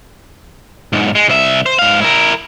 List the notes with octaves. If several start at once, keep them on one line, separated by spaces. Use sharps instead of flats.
B1 G#2
G#3
C2 E5
C5
G#2 F5
E4 A#4